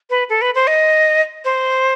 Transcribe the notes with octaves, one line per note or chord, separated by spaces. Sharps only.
B4
A4
B4
C5
D#5
C5